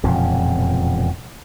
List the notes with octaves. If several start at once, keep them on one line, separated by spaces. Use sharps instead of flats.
E1 F2 A#2 C#3